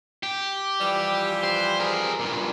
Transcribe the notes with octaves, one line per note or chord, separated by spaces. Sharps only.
G4
E3 F3 G3
C5
G#4 A#4
G2 A#2